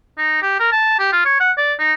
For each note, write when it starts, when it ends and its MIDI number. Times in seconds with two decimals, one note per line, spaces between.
0.18 0.38 63
0.42 0.59 67
0.59 0.69 70
0.72 0.96 81
0.99 1.12 67
1.12 1.25 65
1.25 1.36 73
1.40 1.52 78
1.58 1.74 74
1.79 1.93 63